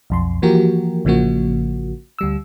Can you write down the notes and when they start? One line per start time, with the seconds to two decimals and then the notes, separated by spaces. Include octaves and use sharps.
0.10 B1 F2 C6
0.42 E3 F3 A#3 F#4 G4 A#4
1.05 A1 C#3 F3 A#3 F#4
2.19 D2 G3 E6